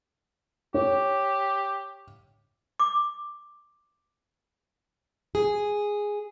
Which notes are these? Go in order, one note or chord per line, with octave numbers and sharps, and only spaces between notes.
G4 C#5
D6
G#4